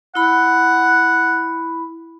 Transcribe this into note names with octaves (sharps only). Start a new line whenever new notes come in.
E4 F#5 B5